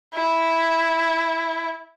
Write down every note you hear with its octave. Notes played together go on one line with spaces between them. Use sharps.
E4